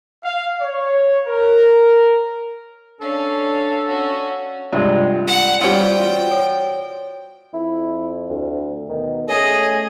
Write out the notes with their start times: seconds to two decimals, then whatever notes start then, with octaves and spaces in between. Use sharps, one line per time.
0.24 F5
0.61 C#5
1.28 A#4
3.01 C#4 D4 A4 F5
3.86 C#4 F#4
4.73 G2 C3 G#3 F4 D5
5.27 F#5
5.61 G3 C#4 F4 C5 D5 G5
5.98 F4 F#4
6.31 C#5
7.54 F2 E4
8.29 D2
8.89 B2 D#3
9.29 A3 C#4 G#4 D#5